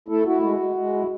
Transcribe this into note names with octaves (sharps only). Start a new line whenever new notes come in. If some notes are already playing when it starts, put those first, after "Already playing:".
A3 E4 A4
E4 F#4
G#3 F#4
G#3
G#3
E4